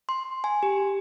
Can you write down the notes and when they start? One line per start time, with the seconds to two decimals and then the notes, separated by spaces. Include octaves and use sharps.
0.09 C6
0.44 G#5
0.63 G4